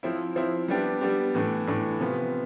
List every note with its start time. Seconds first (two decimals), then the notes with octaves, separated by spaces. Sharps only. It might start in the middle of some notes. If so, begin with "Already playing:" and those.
0.03 F3 C4 E4
0.36 F3 C4 E4
0.68 G3 B3 D4 G4
1.01 G3 B3 D4 G4
1.35 A2 E3 A3 D4
1.67 A2 E3 A3 D4
2.00 C3 F3 B3